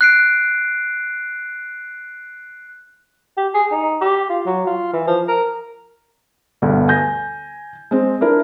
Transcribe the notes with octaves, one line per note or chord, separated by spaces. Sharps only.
F#6 C7 D7
G4
G#4
D#4
G4
F4
F#3
F4
E3
F3
A#4
D2 G2 B2 D3
G#5 G6 A#6
G#3 C4
D4 E4 A#4